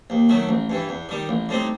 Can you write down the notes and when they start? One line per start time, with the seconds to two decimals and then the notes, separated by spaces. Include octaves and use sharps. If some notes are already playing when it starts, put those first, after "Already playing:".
0.10 D#2
0.29 D#3 F#3 A3
0.49 A1
0.70 G2 E3
0.89 E2
1.09 D#3 G3
1.29 A1
1.49 A2 G3 C4 D#4